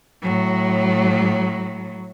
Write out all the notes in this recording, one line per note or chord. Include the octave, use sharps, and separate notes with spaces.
A2 F#3